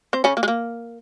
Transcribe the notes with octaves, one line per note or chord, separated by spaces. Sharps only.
C4 C5
C#3 C#4
A#3
G#3
A#3